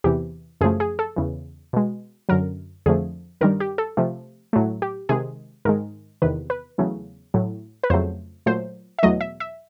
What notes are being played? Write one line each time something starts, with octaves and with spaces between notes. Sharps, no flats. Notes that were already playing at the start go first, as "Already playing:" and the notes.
E2 C3 E3 G4
F#2 C#3 F3 A3 G#4
G#4
A4
E2 C#3 E3
B2 G#3
F#2 D3 F#3 A#4
F2 D3 F3 A3 G#4
G2 D#3 G3 A#4
G4
A4
C3 F3 A3
A2 F#3 A3
G4
C3 D#3 G#3 G#4
G#2 D#3 G#3 A#4
E2 C3 D#3 B4
B4
E2 C#3 F#3 A3
A2 F#3 A3
B4
F2 C#3 F#3 A3 C5
A#2 F#3 A3 C5
E5
E2 B2 F#3 A3 D#5
E5
E5